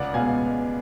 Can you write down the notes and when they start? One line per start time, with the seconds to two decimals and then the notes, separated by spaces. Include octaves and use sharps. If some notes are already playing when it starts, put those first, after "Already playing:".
Already playing: C#2 D5 F#5
0.14 B2 G#3 F5 G#5